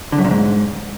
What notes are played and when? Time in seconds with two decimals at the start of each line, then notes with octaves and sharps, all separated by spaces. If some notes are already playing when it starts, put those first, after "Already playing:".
0.12 D3
0.18 F#2
0.24 A#2
0.30 G#2